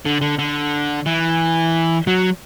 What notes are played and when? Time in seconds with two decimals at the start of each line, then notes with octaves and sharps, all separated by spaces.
0.05 D3
0.21 D3
0.38 D3
1.06 E3
2.07 F#3